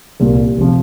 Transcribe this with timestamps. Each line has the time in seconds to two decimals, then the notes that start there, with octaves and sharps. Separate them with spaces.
0.20 C2 A#2 G3 A#3
0.57 F1 C3 F3